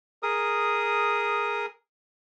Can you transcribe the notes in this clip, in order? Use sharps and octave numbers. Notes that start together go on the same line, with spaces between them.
G#4 A#4 D#6